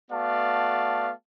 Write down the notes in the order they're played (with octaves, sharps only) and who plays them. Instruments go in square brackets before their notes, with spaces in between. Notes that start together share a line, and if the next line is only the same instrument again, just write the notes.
[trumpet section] A3 B3 F#4 D5 F5 A5